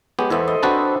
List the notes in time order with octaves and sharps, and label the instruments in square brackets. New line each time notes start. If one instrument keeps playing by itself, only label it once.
[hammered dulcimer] G#3 [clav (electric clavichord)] B3 G4 C#5
[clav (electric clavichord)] E2 B3 [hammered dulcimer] A4 C5 E5
[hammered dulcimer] D#5
[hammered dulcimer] C4 D4 [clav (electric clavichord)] F#4 B4 A5